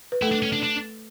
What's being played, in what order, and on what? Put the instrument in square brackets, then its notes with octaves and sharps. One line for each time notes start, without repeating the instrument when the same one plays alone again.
[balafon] B4
[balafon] A3 A4 [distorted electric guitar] E4
[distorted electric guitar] D4
C#4
D4
D4